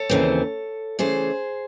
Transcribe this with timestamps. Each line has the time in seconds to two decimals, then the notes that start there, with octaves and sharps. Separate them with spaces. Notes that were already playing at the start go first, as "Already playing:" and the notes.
Already playing: A4 C#5
0.10 D#2 C#3 E3 C4
0.99 C#3 E3 A3 G#4 C5